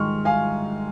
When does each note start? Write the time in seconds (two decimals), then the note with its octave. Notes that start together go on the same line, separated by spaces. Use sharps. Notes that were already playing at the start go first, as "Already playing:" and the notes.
Already playing: G#2 D#3 G#3 D#4 C6 C#6 F6
0.25 F5 G#5